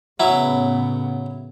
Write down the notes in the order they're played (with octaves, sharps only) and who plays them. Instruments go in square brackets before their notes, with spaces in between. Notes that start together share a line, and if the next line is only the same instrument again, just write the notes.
[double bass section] A2 C#3 B3 [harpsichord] F#3 E4